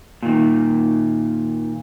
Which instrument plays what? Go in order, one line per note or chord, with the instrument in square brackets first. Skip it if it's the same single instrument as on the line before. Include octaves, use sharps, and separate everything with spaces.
[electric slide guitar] A#2 D#3